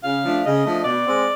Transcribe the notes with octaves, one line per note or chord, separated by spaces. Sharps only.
C#3 F5
F3 A3 D4
C#3 D#5
F3 A3 D4
B2 D5
G#3 C4